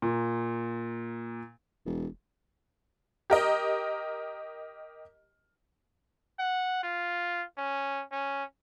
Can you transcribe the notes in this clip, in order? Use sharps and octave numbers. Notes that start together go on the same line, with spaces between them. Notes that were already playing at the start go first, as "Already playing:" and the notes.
A#2
E1
G4 A#4 D#5
F#5
F4
C#4
C#4